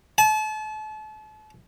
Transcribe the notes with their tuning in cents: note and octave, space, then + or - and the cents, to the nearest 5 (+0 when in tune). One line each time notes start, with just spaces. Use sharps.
A5 -35